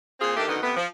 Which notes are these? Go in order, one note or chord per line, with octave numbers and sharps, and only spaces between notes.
A#2 C4 F4 G#4
D#3 A3 D4 G4
F#2 D3 D#3 B3 D#4
C3 A3 B3
F3